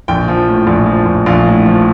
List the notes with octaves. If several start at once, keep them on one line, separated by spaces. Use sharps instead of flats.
A#1 G5
F3
A2
A#1
F3
A#1
A#1 F5
A2
F3